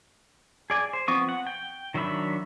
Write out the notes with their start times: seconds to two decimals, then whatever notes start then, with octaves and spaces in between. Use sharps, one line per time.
0.70 G#4 D5 G#5
0.93 C5
1.08 F3 B3 C4 C#6 D#6
1.29 F#5
1.47 G5
1.94 D#3 F#3 D4 E5 B5